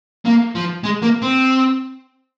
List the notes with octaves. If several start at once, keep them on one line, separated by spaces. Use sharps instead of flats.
A#3
F3
G#3
A#3
C4